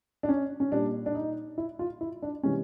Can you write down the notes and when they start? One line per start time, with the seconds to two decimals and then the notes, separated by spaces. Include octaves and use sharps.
0.23 D4
0.29 C#4
0.60 C#4
0.72 A#2 G3 D4
1.06 D4
1.15 D#4
1.58 E4
1.79 F4
2.01 E4
2.23 D4
2.43 C3 E3 G#3 C#4